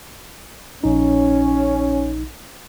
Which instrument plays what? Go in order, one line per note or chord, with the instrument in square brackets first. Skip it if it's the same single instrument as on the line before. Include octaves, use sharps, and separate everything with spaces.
[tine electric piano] A#1 D#4 [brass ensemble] C#4